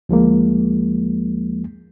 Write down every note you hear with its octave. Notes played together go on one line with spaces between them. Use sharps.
D2 F3 G#3 A#3